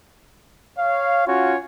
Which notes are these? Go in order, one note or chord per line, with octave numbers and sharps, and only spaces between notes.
C#5 F5
C#4 F4 F#4 C#5